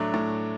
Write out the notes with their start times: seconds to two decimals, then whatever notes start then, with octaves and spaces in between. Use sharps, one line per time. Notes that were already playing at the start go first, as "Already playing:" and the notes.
Already playing: A2 F#3 A3 D4
0.14 A2